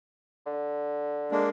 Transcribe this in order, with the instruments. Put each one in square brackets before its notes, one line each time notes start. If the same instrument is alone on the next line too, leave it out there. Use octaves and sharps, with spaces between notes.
[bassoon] D3
[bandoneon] G#3 A#3 D4